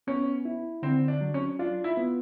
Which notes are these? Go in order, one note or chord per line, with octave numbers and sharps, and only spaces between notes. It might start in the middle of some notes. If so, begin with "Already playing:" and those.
B3 C#4
E4
D3 C4
D4
F#3
C#4
D4 F4
E4
B3